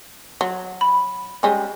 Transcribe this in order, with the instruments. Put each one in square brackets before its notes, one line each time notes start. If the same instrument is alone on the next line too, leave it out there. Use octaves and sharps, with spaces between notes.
[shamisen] F#3
[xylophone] B5
[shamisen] G3 G#3 C#4